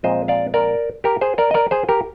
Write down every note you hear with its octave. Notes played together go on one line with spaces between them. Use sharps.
A#2 F3 G#3 C4 C5 D#5
D5 F5
A#4 D5
G4 A#4
G#4 C5
A#4 D5
D#5
A#4 D5
G#4 C5
G4 A#4